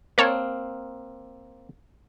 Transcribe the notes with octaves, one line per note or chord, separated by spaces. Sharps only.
A#3 C4 A#4 C#5 F5 A5